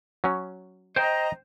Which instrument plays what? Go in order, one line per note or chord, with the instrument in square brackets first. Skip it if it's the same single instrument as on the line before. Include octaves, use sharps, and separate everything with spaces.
[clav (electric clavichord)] F#3 C#4
[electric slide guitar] C5 G5 [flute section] D#5 A#5